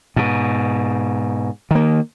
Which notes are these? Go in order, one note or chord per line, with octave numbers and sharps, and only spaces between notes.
G#2 B2
D#3 A#3